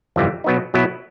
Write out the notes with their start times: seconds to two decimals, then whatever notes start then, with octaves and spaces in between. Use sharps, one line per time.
0.16 G1 F2 C3 E3 G3
0.44 B2 F#3 B3 D#4
0.74 B2 F#3 B3 E4